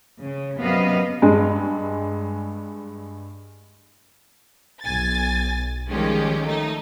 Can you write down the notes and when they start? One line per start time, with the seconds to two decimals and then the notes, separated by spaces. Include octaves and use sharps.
0.21 C#3
0.60 F#2 C3 B3 D#5 F5
1.22 G2 G#3
4.82 B1 G#5 A6
5.89 D#3 F3 G3 G#3 C#4 G4
6.44 A3 D#4